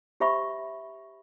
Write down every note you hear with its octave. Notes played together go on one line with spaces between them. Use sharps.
G4 C5 E5 B5 C#6